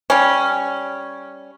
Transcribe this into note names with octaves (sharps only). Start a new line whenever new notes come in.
G3 C#4